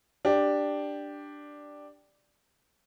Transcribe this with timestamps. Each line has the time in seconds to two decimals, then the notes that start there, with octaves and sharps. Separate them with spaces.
0.25 D4 G4